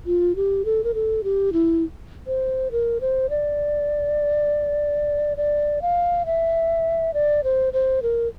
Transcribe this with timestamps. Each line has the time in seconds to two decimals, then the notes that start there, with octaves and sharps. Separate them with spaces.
0.06 F4
0.36 G4
0.65 A4
0.84 A#4
0.94 A4
1.24 G4
1.53 E4
2.27 C5
2.71 A#4
3.01 C5
3.30 D5
5.37 D5
5.82 F5
6.26 E5
7.14 D5
7.44 C5
7.73 C5
8.03 A#4